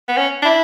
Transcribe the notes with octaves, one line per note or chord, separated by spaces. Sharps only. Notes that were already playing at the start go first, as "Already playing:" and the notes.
B3
C#4
D4
E4